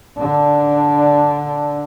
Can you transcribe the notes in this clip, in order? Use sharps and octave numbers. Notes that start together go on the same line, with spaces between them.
D3 D4